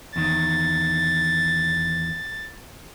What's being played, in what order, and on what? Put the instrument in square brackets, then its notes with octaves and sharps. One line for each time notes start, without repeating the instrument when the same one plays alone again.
[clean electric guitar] E2 D#3 [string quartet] A6